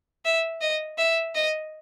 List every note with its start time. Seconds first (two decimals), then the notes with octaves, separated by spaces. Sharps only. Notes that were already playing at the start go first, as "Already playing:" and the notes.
0.25 E5
0.61 D#5
0.97 E5
1.35 D#5